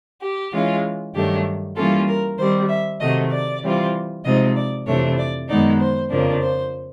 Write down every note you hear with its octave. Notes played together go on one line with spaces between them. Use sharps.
G4
E3 G#3 C#4 F4
G2 D#3 F#3 A3 D4 G4
E3 G3 A#3 C#4 F4 A4
A#4
D#3 G3 C4 C5
E5
C3 D#3 F#3 A3 D#5
D5
E3 G3 C4 F4
C3 F3 G#3 C4 D#4 D#5
D5
F2 C3 E3 A3 D4 C#5
D5
F#2 D#3 G#3 B3 D#4 D5
C5
F2 C#3 F3 A#3 D4
C5